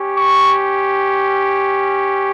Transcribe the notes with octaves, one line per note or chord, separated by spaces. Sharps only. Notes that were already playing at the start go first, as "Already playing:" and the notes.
Already playing: C#4 G4
C#6